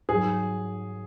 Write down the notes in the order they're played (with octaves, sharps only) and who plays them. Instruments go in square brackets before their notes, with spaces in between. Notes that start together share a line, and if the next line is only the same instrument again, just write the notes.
[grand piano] G#2 F#3 G#4